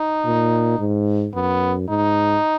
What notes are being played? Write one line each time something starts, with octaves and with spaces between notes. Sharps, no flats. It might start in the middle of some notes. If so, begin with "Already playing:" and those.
Already playing: D#4
A#2
G#2
F#2 B3
G#2 D#4